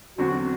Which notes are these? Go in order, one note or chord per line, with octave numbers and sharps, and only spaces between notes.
E2 D3 F#3 C4 F#4